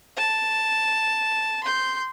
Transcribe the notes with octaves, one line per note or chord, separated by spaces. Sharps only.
A5
C6 G6